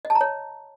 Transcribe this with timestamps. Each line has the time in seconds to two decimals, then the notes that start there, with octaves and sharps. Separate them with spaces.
0.05 D#5
0.10 A5
0.15 A#5
0.21 C#5